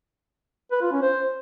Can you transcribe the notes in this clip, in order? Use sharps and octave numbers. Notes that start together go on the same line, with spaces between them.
B4
F4
C#4
C5